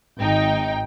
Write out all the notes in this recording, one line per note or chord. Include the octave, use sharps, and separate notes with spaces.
G#1 D#4 G5